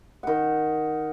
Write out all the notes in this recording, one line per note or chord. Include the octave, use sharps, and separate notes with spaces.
D#3 F#5